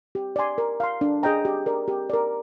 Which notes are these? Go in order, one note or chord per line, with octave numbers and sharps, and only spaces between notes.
G4
D5 G#5 C6
A#4
F5 C6
D4
G#4 D#5 G5 A#5
G4
A#4 D5
G4
A#4 D5